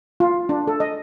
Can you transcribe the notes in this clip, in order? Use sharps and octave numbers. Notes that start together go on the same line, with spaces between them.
F4
D4
A4
D#5